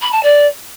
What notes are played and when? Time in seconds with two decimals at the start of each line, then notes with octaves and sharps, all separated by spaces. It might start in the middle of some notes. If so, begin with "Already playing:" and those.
0.01 B5
0.12 A5
0.23 D5